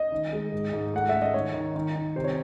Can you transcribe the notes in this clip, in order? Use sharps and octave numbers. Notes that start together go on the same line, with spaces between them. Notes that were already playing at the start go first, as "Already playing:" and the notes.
Already playing: D#5
D#3
G#3
G#2
G#2
A3 F#5
A3 E5
D#5
D#3 C#5
D#3
D#3
D#3
C3 C5
C#5